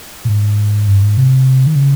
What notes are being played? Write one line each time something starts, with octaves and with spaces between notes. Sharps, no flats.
A#2
G#2
G2
G#2
C3
D#3
C#3